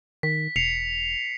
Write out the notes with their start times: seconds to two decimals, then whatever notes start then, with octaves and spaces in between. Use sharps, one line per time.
0.23 D#3 B6
0.56 E1 C7 C#7 F7